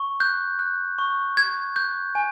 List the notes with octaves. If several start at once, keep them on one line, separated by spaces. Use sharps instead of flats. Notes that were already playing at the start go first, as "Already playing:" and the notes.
Already playing: C#6
F#6 G6
F#6
C#6
C#6 G#6
F#6 G6
G#5